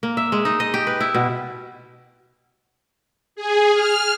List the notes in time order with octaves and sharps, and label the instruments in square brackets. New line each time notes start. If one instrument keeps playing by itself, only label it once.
[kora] A#3
E5
G#3
D#4
D#5
G4
B4
E4
B2
[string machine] G#4
F6